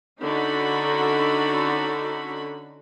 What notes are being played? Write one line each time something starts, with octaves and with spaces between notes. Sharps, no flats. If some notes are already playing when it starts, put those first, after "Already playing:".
D3 C#4 D#4 F#4 B5